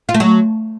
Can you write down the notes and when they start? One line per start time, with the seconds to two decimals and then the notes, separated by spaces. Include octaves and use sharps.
0.09 F4
0.14 A3
0.20 F#3